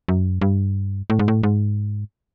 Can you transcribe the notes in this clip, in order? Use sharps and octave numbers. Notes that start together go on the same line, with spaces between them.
F#2
G2
A2
G#2
A2
G#2